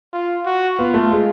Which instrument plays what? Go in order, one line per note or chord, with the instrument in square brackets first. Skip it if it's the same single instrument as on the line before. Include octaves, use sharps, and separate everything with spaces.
[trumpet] F4
F#4
[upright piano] B3 [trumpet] F4
[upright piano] A3
G#3